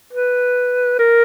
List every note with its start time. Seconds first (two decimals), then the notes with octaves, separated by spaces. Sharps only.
0.13 B4
0.99 A#4